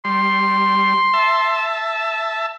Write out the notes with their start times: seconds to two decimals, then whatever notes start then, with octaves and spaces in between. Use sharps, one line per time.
0.05 G3 C6
1.14 E5 A5